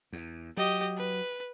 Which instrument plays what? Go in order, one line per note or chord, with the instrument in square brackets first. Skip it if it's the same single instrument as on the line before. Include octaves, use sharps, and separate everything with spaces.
[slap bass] E2
[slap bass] F#3 [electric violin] G4 D#5
[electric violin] B4